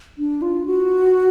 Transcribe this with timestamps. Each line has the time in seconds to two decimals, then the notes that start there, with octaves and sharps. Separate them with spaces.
0.18 D4
0.42 F4
0.66 F#4